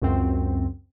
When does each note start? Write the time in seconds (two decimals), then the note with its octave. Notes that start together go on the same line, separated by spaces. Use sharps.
0.02 C#2 F#2 C4